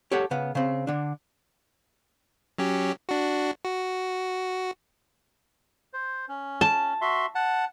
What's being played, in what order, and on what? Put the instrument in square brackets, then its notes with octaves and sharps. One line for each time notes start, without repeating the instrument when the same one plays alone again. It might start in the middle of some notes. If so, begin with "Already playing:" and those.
[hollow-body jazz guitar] G4 A4 C#5 F#5
C#3 B3
C#3 C4
D3 D4
[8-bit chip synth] F#3 C#4 G4
D4 F#4
F#4
[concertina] C5
C#4
[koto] A5
[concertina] F#4 E5 C6
F#5 A5